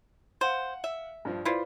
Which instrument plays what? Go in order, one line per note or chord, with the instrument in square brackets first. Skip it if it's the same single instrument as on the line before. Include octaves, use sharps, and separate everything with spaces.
[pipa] C5 [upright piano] F5 F#5
[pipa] E5
[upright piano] G2 F3
[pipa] E4 F4 [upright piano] B4 C5 D5